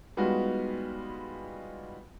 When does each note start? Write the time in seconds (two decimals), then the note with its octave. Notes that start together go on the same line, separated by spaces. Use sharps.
0.17 G3 G#3 B3 D#4 F4 F#4